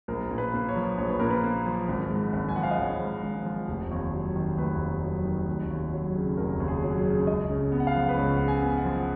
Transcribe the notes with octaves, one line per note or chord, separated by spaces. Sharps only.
A#1 A#4
A#2
B4
A#3
C#5
F3
A#1 C#5
B4
A#2 A#4
B4
A#3
F3
G#1
G#2
G#1
G#5
F3 F#5
F5
D#5
G#1 C#5
G#2
G#1
F3
F1
D#2
F#3
D#3
F1 B4
D#2
F#3
D#3
F1
D#2
F#3
C#3
F1 A#4
D#2
G#4
F#3
G#4
C#3
C#2 D#5
C#3
B3
F#5
F5
F3
B4
C#2 C#5
C#3 F#5
G#5
B3
F#5
F3